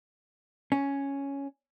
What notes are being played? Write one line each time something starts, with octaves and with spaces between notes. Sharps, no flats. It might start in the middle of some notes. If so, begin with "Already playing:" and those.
C#4